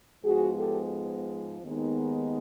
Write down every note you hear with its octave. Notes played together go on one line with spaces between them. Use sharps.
G#2 F3 G#3 B3 F#4 G#4
G4 A4
D#2 D#3 G#3 B3 D#4